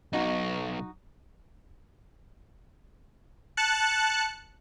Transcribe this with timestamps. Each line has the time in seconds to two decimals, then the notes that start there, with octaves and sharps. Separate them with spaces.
0.13 B1 D#4 F#4
3.57 A5 F#6 C#7